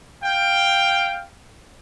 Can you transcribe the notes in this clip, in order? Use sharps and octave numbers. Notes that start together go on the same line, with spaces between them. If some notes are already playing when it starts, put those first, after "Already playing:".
F5 G5